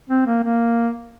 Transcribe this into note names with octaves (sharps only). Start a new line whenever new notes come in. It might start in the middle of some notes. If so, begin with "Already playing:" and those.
C4
A#3
A#3